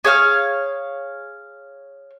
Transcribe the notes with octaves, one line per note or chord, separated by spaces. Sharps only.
G#4 C#5 F5 F6